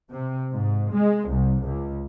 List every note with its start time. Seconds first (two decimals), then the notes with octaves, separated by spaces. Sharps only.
0.11 C3
0.53 G#2
0.93 G#3
1.29 C2
1.63 C#2